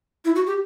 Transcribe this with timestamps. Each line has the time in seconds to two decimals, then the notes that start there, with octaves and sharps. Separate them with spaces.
0.25 E4
0.36 F#4
0.47 G4